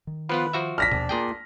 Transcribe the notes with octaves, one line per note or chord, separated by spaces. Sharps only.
D#3
F3 B3 F4 B4
F3 F#4 E5
D4 F6 A#6 B6
A#1 D#2 B2
A#2 A3 A#3 G#4 G5